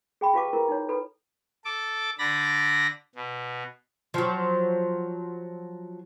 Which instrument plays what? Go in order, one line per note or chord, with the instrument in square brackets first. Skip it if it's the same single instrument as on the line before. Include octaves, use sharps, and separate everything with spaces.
[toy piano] G#4 G5 B5
F4 G4 B4 F5 A5 D6
E4 A#4 B4
D#4 C#5
A4 B4 B5
[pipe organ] A4 D6
D3 D5 B5 A#6
B2
[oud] F3 F#3